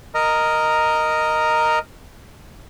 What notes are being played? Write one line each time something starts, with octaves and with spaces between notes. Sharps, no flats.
A#4 D#5 A#5